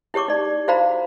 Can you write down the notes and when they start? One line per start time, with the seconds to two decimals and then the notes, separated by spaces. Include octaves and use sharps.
0.14 E4 G4 C#5 C#6 D6
0.28 D#4 D5
0.68 E4 F#4 C5 F5 A#5 B5